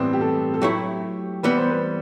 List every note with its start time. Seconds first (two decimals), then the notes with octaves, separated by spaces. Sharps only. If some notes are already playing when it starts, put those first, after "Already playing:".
Already playing: A2 E3 G3 B3 C4 D4 G4
0.13 G4
0.21 A4
0.54 A4
0.61 F#3 A3 E4 G4
1.43 E3 G3 B3 B4
1.57 C5
1.71 B4